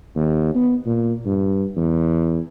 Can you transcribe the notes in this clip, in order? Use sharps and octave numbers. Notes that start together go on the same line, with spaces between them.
D#2
B3
A#2
G2
E2